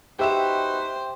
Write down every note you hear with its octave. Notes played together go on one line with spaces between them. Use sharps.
D#4 F#4 G4 B4 C5 E5 G5 E7